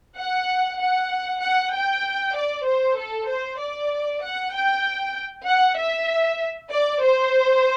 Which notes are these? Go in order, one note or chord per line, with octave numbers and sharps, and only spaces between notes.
F#5
F#5
F#5
G5
D5
C5
A4
C5
D5
F#5
G5
F#5
E5
D5
C5